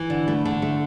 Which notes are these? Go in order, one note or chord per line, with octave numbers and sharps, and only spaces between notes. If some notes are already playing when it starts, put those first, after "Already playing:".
Already playing: E3
D3
A3
D3
A3